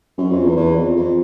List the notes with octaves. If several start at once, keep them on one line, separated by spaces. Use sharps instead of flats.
F#2
F2
E2
E2
F2
F2